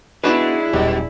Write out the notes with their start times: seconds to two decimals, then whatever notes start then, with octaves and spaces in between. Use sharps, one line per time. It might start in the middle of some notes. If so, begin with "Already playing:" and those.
0.24 G#3 B3 D4 E4 F#4 B4
0.73 D#1 F#2 B2 G3 G4